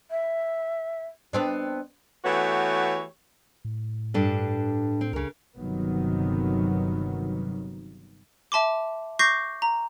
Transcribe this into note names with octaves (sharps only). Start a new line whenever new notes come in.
E5
B3 C4 D4
E3 A3 B3 F#4 G4 C#5
A2
G2 D4 A4
C4
C#2 C#3 A#4
G1 C3 D#3 F#3 B3
E5 A5 C6 D6
C#6 D6 G6 A#6 C7
A#5